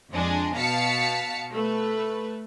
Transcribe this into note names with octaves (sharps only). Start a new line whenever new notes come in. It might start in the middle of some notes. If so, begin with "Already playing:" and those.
F2 G#3 D4 G#5
B2 F5 A5 B6 C#7
A3 B4